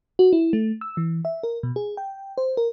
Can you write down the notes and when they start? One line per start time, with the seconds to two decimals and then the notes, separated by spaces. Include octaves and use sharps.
0.19 F#4
0.33 E4
0.53 A3
0.81 E6
0.97 E3
1.25 E5
1.43 A#4
1.63 B2
1.76 G#4
1.97 G5
2.38 C5
2.57 A#4